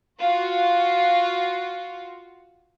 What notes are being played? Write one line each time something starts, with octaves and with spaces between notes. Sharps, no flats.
F4 F#4